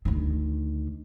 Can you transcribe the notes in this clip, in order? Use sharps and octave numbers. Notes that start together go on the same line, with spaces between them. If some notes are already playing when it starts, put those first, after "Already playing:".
D2 D#3